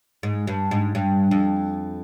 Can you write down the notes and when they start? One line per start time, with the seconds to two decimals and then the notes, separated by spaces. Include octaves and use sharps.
0.23 G#2
0.47 G2
0.71 G#2
0.95 G2
1.31 F2